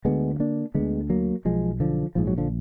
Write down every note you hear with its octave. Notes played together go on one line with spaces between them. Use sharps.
D2 D3 G#3 B3
A#3 D4
D2 D3 G#3 B3
F#3 A#3
B1 B2 F3 G#3
D3 F3
A#1 G#2 F3
F#3
D3 F3